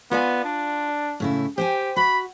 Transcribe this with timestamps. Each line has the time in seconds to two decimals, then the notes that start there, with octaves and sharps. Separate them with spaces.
0.11 B3 F4 D5 G#5
0.44 D4
1.20 A2 C#3 E4
1.58 G4 C5 G5 G#5
1.96 F#4 B5